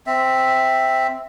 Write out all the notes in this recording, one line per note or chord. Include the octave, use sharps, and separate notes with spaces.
C4 E5